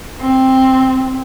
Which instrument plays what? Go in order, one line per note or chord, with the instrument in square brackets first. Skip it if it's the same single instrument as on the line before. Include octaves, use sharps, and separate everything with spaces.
[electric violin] C4